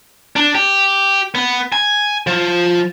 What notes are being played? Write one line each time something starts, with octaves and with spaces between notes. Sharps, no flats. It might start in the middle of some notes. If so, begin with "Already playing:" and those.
D4
G4
B3
G#5
F3